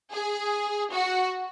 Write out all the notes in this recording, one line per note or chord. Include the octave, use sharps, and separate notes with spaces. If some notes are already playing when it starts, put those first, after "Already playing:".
G#4
F#4